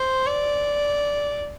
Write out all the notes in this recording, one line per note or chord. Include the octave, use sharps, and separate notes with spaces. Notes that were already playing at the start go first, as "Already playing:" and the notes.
Already playing: C5
D5